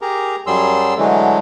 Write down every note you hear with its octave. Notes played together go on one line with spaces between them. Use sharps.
G4 G#4 A#4 A#5
F#2 F#3 G3 G#4 C6 E6
D3 E3 F#3 G#3 A3